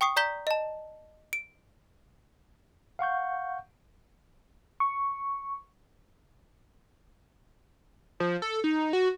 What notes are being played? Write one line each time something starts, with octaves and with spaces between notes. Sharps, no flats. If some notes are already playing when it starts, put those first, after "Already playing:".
G5 C#6 D#6 C7
D5 A#5 G6 B6 G7
D#5 A5
D7
F5 F#5 C#6 G6
C#6
F3
A4
D#4
F#4